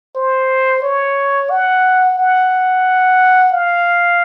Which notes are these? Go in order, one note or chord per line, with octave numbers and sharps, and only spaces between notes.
C5
C#5
F#5
F#5
F5